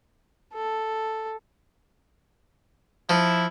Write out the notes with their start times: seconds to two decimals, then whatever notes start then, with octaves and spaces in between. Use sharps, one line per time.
0.54 A4
3.10 F3 E4